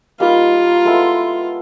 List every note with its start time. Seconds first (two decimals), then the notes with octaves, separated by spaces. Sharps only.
0.20 G3 A#3 D#4 F4
0.85 G#3 B3 E4 A4